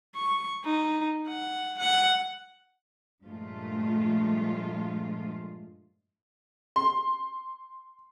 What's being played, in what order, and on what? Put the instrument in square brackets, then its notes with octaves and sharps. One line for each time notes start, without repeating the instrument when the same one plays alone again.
[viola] C#6
D#4
F#5
F#5
[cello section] G2 A#2 F3 G#3 A3 F4
[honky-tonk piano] C6